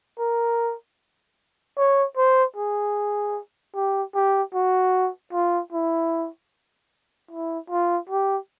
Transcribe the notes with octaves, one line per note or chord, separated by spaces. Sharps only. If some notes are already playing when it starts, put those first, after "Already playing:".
A#4
C#5
C5
G#4
G4
G4
F#4
F4
E4
E4
F4
G4